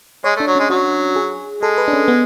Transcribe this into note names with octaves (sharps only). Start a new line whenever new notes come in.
G#3 C#5
A3
D4
F#3
G#3 C#4
F#3 F#4
G#4
G#3 A4
B4
D4
C#4
B3